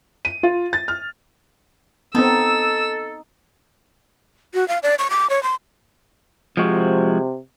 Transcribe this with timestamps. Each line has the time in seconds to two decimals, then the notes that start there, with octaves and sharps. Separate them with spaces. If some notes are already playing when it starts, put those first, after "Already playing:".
0.25 D#7
0.43 F4
0.73 A6
0.88 F6
2.15 B3 C4 D#4 A4 E6
4.54 F#4
4.68 F5
4.83 D5
4.99 C#6
5.10 D6
5.30 C#5
5.43 C6
6.57 C3 F3 G#3 F#4